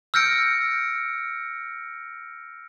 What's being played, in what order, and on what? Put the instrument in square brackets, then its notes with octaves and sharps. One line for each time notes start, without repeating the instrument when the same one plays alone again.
[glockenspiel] E6 F6 G6 A#6 C#7 D7